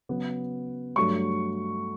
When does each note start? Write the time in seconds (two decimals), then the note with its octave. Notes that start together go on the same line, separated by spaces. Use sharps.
0.09 C#3 F#3 B3
0.96 G2 F#3 A3 C#6